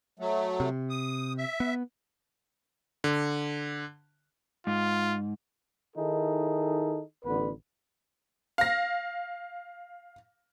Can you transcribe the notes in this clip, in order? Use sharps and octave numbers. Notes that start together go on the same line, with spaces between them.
F#3 A3
C3
D#6
E5
B3
D3
G#2 F4
D#3 D#4 E4 G#4 A4
A1 D3 B3 B4
F5 A#6